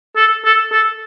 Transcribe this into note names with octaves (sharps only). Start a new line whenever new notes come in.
A4
A4
A4